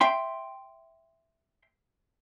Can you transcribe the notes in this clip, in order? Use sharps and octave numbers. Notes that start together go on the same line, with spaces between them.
E5 G5 C6